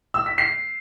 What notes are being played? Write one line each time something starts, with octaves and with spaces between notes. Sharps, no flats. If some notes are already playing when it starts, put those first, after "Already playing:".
E6
B6
C7